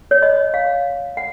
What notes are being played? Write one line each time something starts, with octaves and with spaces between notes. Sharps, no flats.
C#5
D#5
F5
F#5